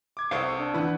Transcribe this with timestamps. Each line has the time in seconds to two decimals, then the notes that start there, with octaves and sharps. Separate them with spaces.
0.17 D6 G#6
0.31 C2 A4 C5 F5 C#6 D#6
0.58 D4
0.74 E3 E4 B4 F#5